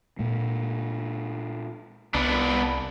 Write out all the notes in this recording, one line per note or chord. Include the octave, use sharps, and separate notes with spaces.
A#2 G#3
C2 B3 D4